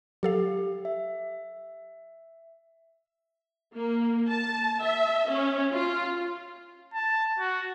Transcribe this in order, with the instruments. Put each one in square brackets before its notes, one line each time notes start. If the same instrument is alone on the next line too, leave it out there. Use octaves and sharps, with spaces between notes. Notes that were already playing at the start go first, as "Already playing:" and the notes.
[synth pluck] F#3 A4 F5 [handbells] G4
[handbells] E5
[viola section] A#3
A5
E5
C#4
F4
[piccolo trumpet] A5
F#4